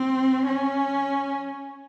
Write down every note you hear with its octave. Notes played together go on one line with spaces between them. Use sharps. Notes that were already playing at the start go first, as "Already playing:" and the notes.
Already playing: C4
C#4